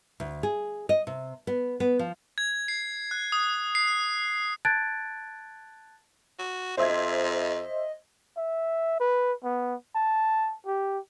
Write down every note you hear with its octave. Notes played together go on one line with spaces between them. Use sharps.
D2
G#4
D#5
C3
B3
B3
F3
G#6
C7
F#6
D#6
C7
F#6
A5 F#6 G#6 A6 D7
F#4
F2 C5 D#5 E5 G#6
E5
B4
B3
A5
G4